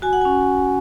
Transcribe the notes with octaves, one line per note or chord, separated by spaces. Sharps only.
F#4 G#5
F#5
C#4 G#5